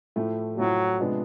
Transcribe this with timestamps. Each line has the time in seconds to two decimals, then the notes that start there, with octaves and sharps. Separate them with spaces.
0.16 A2 F3 A3
0.57 A2 F3 F#3 A3
1.00 C3 F3 G#3 B3 D4